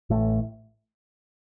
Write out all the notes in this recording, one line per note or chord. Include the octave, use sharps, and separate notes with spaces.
A1 A2 A3